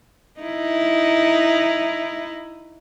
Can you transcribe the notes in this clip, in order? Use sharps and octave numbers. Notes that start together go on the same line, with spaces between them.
D#4 E4